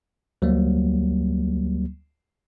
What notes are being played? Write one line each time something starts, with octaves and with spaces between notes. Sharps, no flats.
D2 F#3 G3 A#3